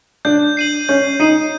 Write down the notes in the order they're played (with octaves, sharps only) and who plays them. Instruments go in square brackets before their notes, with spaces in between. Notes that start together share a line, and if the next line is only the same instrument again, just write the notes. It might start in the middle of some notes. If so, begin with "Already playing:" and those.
[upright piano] D4 [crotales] G6
[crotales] C7 D#7 F#7
[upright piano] C#4 [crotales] G6
[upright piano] D#4 [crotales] C7 D#7 F#7